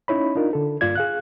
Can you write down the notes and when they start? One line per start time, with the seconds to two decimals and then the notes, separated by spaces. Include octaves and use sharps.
0.08 C#4 D#4 E4 C#5 B5
0.36 D4 D#4 F4 A#4
0.53 D3 A4
0.81 G2 A#3 F4 D5 G#6
0.95 G#4 F5 F#6